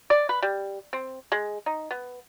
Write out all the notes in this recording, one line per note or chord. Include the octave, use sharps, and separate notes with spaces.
D5
B4
G3
C4
G#3
D#4
B3